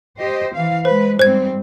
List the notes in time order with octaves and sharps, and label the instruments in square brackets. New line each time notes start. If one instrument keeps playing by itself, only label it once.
[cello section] G4 C5 D#5
E3 F5
[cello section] G#3 B4 [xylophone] C5
[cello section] G#2 G3 C4 [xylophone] C5 G#6